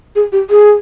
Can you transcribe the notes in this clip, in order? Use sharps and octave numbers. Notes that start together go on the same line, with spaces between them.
G#4
G4
G#4